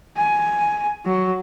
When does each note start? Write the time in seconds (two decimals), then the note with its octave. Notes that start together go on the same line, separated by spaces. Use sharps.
0.17 G#5
1.06 F#3